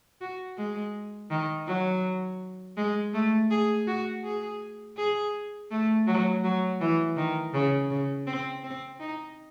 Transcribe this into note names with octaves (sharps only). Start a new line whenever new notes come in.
F#4
G#3
D#3
F#3
G#3
A3
G#4
F#4
G#4
G#4
A3
F#3
F#3
E3
D#3
C#3
C#3
C4
C4
D#4